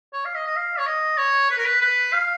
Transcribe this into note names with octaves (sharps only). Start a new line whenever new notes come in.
C#5
F5
D#5
D#5
F5
C#5
D#5
C#5
B4
A#4
B4
B4
F5